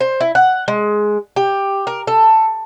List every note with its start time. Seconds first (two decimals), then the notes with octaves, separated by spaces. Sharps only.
0.01 C5
0.20 E4
0.35 F#5
0.68 G#3
1.36 G4
1.87 A#4
2.07 A4